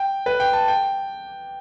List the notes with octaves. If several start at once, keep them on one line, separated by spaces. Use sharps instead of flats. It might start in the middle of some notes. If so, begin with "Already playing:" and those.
Already playing: G5
B4
G5
A5
G5